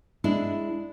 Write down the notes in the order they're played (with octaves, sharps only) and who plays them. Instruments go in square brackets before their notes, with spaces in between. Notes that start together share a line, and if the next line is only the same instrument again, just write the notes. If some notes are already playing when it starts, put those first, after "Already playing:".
[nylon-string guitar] G#3 D4 E4